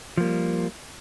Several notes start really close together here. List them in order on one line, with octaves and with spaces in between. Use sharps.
F3 A#3 G3